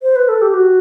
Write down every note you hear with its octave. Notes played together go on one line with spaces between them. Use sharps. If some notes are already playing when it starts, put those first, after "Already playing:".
C5
B4
A4
G4
F#4